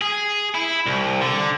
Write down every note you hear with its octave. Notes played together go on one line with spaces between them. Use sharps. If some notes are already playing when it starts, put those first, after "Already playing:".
G#4
E4
C2
D3